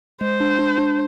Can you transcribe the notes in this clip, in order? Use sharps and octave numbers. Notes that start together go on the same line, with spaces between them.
G#3 C5
D4
D4
D4